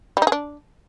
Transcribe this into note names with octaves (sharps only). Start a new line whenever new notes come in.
G3
D#4
G#4
D4